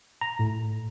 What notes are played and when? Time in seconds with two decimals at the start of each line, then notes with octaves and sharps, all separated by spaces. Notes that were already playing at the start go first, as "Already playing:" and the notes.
0.21 A#5
0.39 A2